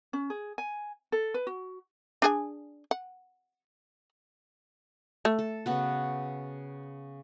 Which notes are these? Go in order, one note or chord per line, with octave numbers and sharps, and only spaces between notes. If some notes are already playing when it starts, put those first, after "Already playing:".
C#4
G#4
G#5
A4
B4
F#4
D4 G#4 G#5
F#5
A3
A4
C#3 B3 F#4